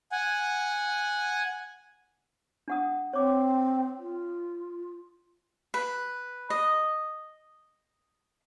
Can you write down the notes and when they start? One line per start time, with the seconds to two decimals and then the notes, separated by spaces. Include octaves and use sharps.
0.12 F#5 G#5
2.68 D4 F#5 D#6
3.13 C4 C#5 D6
3.98 F4
5.74 B4
6.50 D#5